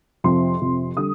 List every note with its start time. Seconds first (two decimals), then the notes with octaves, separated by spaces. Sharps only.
0.24 F2 C3 F3 C6
0.61 F2 C3 F3
0.97 D3 G3 D#6